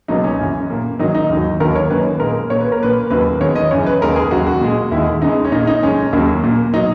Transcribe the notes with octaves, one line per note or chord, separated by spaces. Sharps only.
C#2 B2 F#3 A#3 D#4
C#4
F#2 C#3 E3
A#2 A#3
G#2 D#3 F#3 A#3 D#4
D#4
D#2 D#3 F#3
D#2 D#3 F#3 A#4
C#5
F#2 D#3 A#3 B4
A#2 G#3 A#4
A#2 A#3 C#5
B4
A#4
A#2 A#3 B4
D#2 C#3 F#3 A#3 B4
E2 D#3 G#3 C#5
D#5
F#2 C#3 E3 C#5
B4
D#2 C#3 G#3 A#4
G#4
D#2 C#3 F#3 F#4
F#4
A#2 G#3
D#2 D#3 G#3 E4
E2 C#3 G#3 D#4
C#4
A#2 A#3 D#4
D#4
F#2 C#3 G#3 C#4
D#2 C#3 F#3 A#3
A#2 A#3
B2 F#3 D#4